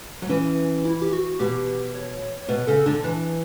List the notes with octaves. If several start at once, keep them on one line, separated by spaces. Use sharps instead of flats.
F#3
E3 C#4
E4
G4
F#4
B2 G4
C#5
B2 B4
C#3 A4
D3 D4
E3 D4